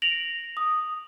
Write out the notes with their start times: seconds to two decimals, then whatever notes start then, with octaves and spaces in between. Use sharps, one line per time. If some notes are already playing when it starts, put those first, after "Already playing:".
0.02 A#6 D7 F7 F#7
0.57 D#6